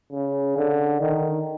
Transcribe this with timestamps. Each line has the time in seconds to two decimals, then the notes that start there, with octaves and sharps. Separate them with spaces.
0.12 C#3
0.57 D3
1.00 D#3